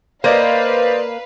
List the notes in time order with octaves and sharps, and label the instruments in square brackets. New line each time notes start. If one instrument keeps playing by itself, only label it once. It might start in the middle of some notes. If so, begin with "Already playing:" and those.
[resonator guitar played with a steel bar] A#3 [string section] B4 F5 [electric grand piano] C5 D5 D#5